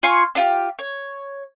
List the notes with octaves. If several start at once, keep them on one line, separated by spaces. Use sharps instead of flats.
F4 G#5 C6 C#6
D4 F4 G4
C#5